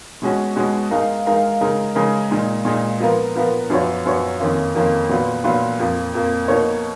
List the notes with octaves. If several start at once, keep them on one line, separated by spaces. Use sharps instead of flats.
B2 G#3 C#4 F#4
B2 G#3 C#4 F#4
G#3 D#4 A#4 F5
G#3 D#4 A#4 F5
C#3 G#3 D#4 A#4
C#3 G#3 D#4 A#4
A#2 G#3 D#4
A#2 G#3 D#4
F3 B3 F4 A#4
F3 B3 F4 A#4
F#2 F3 B3 F#4 C#5
F#2 F3 B3 F#4 C#5
F2 D#3 A#3 C#4 F4
F2 D#3 A#3 C#4 F4
A#2 F#3 B3 F4 B4
A#2 F#3 B3 F4 B4
F2 F3 A#3
F2 F3 A#3
B2 A#3 D#4 A#4 C#5